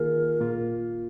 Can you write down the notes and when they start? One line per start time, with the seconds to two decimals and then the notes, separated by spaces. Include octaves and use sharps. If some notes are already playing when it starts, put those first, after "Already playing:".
Already playing: D#3 A#3 F4 G#4 A#4
0.40 A#2 A#3 F4